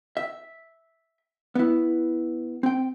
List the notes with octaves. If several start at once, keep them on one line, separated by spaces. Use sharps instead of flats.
E5
B3 E4
C4 G5